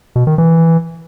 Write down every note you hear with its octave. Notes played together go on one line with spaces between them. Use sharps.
B2
D#3
E3